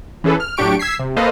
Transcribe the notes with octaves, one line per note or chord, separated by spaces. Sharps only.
E3 C#4 G#4 A4 B4
F6
A2 F#3 D4 G4 C#6 D7
E6 G#6 B6 C7
C3
A#3 A4 B4 C5 D#5 F5